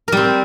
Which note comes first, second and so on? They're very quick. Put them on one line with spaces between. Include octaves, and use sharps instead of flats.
A#4 G3 C4